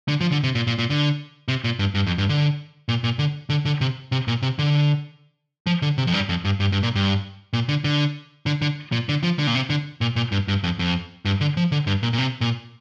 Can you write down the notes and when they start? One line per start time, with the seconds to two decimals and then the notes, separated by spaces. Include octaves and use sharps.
0.08 D3
0.21 F3
0.32 D3
0.44 C3
0.55 A#2
0.67 A#2
0.79 A#2
0.90 D3
1.48 C3
1.64 A#2
1.79 G2
1.95 G2
2.06 F2
2.18 G2
2.29 D3
2.89 A#2
3.04 A#2
3.19 D3
3.50 D3
3.65 D3
3.81 C3
4.12 C3
4.28 A#2
4.42 C3
4.59 D3
5.67 F3
5.82 D3
5.98 C3
6.07 F2
6.14 G2
6.29 F2
6.45 G2
6.60 G2
6.72 G2
6.83 A#2
6.95 G2
7.53 A#2
7.69 D3
7.84 D3
8.46 D3
8.62 D3
8.92 A#2
9.09 D3
9.23 F3
9.39 D3
9.47 A#2
9.55 C3
9.70 D3
10.01 A#2
10.16 A#2
10.32 G2
10.48 G2
10.64 F2
10.79 F2
11.25 G2
11.41 D3
11.57 F3
11.72 D3
11.87 G2
12.03 A#2
12.13 A#2
12.18 C3
12.41 A#2